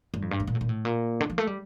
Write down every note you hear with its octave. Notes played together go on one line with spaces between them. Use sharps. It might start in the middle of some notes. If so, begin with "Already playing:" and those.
G2
F2
G2
A2
A#2
A2
A#2
A2
A#2
D3
F3
A3
G3